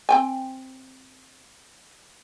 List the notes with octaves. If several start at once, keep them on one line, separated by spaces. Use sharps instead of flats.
C4 G5 G#5